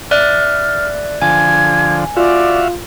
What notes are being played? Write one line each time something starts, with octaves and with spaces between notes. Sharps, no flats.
D5 E5 F6 F#6
D3 F3 G#5 G#6
F4 F#4 D5 E5 F5